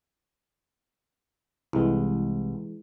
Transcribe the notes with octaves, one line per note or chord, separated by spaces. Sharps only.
C2 E3 G#3